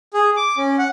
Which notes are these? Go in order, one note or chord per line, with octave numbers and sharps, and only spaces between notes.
G#4
D6
C#4
F#5